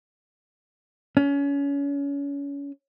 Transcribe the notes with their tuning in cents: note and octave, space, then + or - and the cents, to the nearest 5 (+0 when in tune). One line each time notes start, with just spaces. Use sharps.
C#4 +30